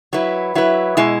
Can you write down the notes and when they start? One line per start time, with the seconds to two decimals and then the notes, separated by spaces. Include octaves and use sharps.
0.13 F#3 E4 B4
0.55 F#3 E4 B4
0.97 B2 G#3 E4